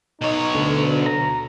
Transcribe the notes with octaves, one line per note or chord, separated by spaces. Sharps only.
B2 D#4 C#5
D2 D3
A#5